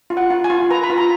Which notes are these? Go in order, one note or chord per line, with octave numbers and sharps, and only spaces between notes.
F4
F#5
F4
G#5
F4
B4 A#5
B5
F4
A#5